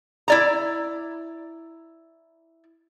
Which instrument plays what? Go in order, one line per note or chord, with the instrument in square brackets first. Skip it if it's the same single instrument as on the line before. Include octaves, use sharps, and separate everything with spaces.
[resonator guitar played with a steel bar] E4 D5 A#5